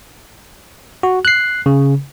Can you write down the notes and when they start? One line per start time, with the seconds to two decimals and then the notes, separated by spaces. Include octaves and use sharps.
1.03 F#4
1.25 F#6 C7
1.66 C#3